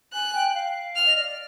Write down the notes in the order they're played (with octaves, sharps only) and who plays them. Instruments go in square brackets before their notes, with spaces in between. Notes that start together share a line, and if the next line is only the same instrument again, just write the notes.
[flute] G#5 [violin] F#6
[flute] G5
F5
[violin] F6
[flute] D#5
D5
D5